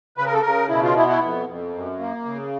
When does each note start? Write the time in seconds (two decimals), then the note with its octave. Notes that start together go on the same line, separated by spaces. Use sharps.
0.17 C#3 B4
0.26 A#4
0.33 A4
0.41 C#3 A#4
0.69 B2 E4
0.83 F4
0.95 B3 E4
1.08 E4
1.22 F2
1.47 F2
1.74 F#2
1.99 A#3
2.25 C#3